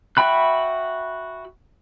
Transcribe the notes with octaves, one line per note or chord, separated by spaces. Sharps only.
F#4 E5 G5 B5 F#6